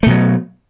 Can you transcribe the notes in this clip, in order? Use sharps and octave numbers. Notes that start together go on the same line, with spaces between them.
B2 F#3 A3